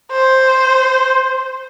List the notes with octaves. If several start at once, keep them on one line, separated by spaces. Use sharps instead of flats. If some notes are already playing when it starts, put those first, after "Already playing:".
C5